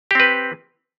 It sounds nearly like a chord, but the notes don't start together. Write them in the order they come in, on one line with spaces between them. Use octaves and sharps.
G4 C4 B4